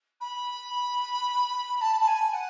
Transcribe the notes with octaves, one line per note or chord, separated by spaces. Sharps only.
B5
A5
A5
G#5
F#5